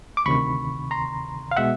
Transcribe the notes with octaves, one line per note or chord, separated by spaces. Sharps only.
D6
D2 C3 D#3 B5 C#6
A#5 C6
F5
B2 G#3 E5 F#5